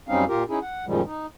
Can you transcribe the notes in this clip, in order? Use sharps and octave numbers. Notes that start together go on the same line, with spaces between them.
F#2 G3 C4 C#4 D#4 F5
A#2 F4 G4 A#4
C#4 D#4 E4 G#4
F#5
F#2 A#2 D#3 F3 G3 G#3
D#4